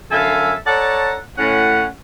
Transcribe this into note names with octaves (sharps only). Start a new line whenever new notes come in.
F#2 D3 A4 E5 F5 G#5
A4 C#5 D5 F#5 A5 A#5
A2 C#4 F#5